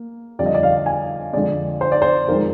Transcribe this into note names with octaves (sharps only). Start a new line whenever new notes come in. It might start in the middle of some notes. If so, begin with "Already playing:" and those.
Already playing: A#3
F2 D3 G3 D5
D#5
D5
F5
G#5
F2 D3 G#3 D5
C5
D5
C5
F2 D#3 G#3 A#4